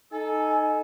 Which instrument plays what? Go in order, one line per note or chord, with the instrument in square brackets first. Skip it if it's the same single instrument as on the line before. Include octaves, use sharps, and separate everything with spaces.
[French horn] D#4 [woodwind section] A4 [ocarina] G#5